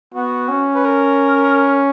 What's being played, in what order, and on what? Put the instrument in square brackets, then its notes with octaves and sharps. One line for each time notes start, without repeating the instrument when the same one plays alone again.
[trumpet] B3 [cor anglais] F#4
[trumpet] C#4
[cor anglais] B4
A#4